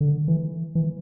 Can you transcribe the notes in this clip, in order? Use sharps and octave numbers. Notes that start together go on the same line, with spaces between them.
D3
E3
E3